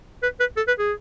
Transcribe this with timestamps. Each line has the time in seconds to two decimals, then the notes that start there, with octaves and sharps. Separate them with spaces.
0.23 B4
0.40 B4
0.57 A4
0.68 B4
0.79 G#4